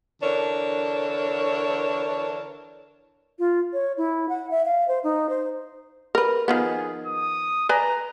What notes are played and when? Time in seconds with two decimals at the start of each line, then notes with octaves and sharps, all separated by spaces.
0.22 D3 E3 D4 A#4 C#5
3.39 F4
3.73 C#5
3.97 E4
4.29 F#5
4.51 E5
4.65 F5
4.88 C5
5.04 D#4
5.29 C5
6.15 A#4 B4
6.48 D#3 F3 B3 G#4
7.06 D#6
7.69 B4 D5 G#5 A#5